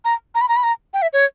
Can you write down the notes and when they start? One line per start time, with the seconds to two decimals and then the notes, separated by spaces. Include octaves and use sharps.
0.05 A#5
0.35 A#5
0.41 B5
0.49 A#5
0.56 B5
0.63 A#5
0.94 G5
1.02 E5
1.13 C#5